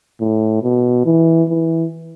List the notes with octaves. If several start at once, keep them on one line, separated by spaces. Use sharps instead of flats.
A2
B2
E3
E3